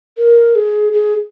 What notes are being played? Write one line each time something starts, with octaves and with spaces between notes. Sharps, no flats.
A#4
G#4
G#4